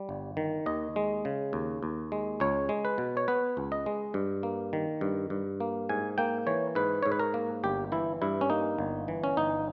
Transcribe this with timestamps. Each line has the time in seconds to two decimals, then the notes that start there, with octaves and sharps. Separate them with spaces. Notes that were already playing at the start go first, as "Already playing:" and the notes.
Already playing: G3
0.09 G1
0.37 D#3
0.66 D#2 D#5
0.96 G#3
1.25 C#3
1.53 D#2
1.83 D#2
2.12 G#3
2.40 C#2 C#5
2.69 G#3
2.85 B4
2.98 B2
3.17 C#5
3.28 B3 B4
3.57 C#2
3.72 D#5
3.86 G#3
4.14 G2
4.43 A#3
4.73 D#3
5.01 G2
5.30 G2
5.60 A#3
5.89 G#2 G#5
6.18 A#3 G5
6.47 E3 C#5
6.75 G#2 B4
7.03 G#2 C#5
7.12 B4
7.20 A#4
7.34 A#3
7.64 G1 G4
7.92 E3 E4
8.22 G2 E4
8.41 C#4
8.50 A#3 D#4
8.78 G1
9.08 E3
9.24 C#4
9.37 G1 D#4